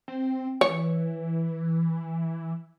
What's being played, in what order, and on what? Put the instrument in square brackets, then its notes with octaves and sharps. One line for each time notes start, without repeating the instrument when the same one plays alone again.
[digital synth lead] C4
[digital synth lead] E3 [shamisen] C#5